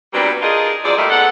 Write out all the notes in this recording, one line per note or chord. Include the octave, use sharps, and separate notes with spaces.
A#2 F#3 G3 B3 C4 D4
D4 D#4 F4 G#4 A#4 D#5
F#2 F3 C4 G#4 D5
A#2 D#3 G3 A3 A#3 D#4
G#2 B3 A4 F#5